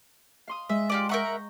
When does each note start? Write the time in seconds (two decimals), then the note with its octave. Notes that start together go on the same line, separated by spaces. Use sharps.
0.47 F5 C6 D#6
0.69 G#3 E5
0.90 F4 G4 D5
1.09 A#4 E5 F#5 A#5 C#6 G6